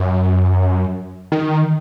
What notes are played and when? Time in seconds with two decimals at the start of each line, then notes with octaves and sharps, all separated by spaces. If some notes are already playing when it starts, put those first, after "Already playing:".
Already playing: F#2
1.32 D#3